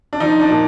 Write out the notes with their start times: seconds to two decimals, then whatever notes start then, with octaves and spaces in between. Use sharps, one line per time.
0.13 D4
0.20 F3 D#4
0.40 D4
0.50 A#2